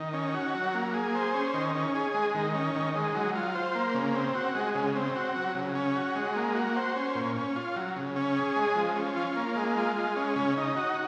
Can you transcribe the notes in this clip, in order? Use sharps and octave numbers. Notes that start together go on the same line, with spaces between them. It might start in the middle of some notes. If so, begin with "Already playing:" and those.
Already playing: D#3
C#4
F#4
F#3
A#3
G#4
C5
C#4
D#3
C#4
G#4
G#3
D#3
C#4
D#3
G#3
F#3
F4
C5
A#3
C#3
C4
F#4
G#3
C#3
C4
F#4
F#3
C#3
C#4
F#4
G#3
A#3
F#4
C5
C#4
A#2
C#4
F4
F#3
C#3
C#4
G#4
G#3
F3
C#4
F4
A#3
G#3
F4
G#3
C#4
C#3
D#4
F#4